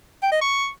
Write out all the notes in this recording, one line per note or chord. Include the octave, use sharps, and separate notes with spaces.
G5
D#5
C#6